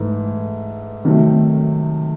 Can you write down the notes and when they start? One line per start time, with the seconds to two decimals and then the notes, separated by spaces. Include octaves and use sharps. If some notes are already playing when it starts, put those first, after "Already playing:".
Already playing: G#2 E3 A3
1.04 C3 D#3 F#3 A3